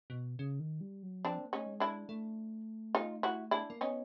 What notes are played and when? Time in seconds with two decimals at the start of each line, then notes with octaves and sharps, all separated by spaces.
0.10 B2
0.39 C#3
0.60 D#3
0.81 G3
1.03 F#3
1.25 F3 C4 D4
1.39 A#3
1.53 A3 C#4 D#4
1.66 G#3
1.80 D4 E4
2.09 A3
2.95 D#4 F4
3.23 E4 F#4
3.51 D4 E4
3.70 A#3
3.81 B3 C#4 D#4